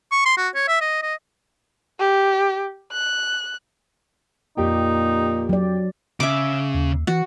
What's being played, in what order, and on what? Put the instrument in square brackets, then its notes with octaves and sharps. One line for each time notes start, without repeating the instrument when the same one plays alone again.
[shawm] C#6
C6
F#4
C#5
E5
D#5
D#5
[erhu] G4
F#6
[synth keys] F2 G4 G5 [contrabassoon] A#2 [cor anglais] D#4
[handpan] F#3 D5
[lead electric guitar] C#3 [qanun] E5 D6
[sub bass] D#2
[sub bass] E3 [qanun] F#4